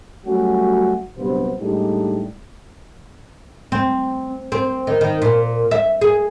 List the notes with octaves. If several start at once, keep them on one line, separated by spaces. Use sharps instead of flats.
F#3 G3 A3 C#4 F#4
A#1 G2 C3 F#3 B3 C5
A2 G3 G#3 D4 D#4 G4
C4
C4
D#3
D#3
A#2
E5
G#4